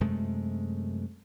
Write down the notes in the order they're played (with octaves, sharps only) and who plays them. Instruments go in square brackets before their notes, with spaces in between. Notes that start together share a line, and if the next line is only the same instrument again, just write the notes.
[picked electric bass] F#2 C3 G#3 A3